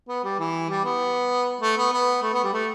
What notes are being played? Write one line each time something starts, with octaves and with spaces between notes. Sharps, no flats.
B3
G3
E3
G3
B3
A3
B3
B3
A3
B3
G3
A3